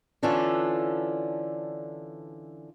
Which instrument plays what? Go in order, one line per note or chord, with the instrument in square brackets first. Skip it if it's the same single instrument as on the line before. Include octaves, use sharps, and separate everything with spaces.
[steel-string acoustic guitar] D3 E3 C#4 D4 F4 A4